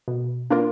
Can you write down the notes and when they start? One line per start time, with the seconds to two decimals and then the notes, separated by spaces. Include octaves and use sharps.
0.08 B2
0.50 A#3 D4 F4 A#4